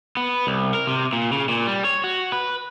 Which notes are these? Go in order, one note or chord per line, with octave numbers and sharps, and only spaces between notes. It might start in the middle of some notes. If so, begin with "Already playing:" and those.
B3
C2
A#4
C3
A#2
C#3
A#2
G3
C#5
F#4
B4